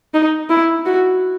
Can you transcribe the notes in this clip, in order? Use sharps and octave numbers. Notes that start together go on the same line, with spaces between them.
D#4
E4
F#4